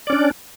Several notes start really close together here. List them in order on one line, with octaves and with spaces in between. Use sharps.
D5 C#4 D4